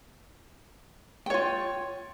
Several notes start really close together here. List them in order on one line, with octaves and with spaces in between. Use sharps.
G5 C#5 F4